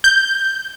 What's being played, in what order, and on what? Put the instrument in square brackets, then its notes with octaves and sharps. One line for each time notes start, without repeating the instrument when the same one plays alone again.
[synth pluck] G6